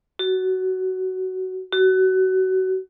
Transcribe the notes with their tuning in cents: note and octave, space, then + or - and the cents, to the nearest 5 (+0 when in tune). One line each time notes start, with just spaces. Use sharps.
F#4 +15
F#4 +25